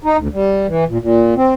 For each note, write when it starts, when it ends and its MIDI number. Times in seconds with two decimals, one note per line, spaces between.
0.04 0.17 63
0.18 0.28 38
0.33 0.67 55
0.68 0.84 52
0.88 0.98 46
1.01 1.34 46
1.36 1.54 60